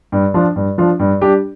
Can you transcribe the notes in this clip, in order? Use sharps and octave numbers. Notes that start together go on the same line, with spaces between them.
G2
F3 D4 F4
G2
F3 D4 F4
G2
G3 D4 G4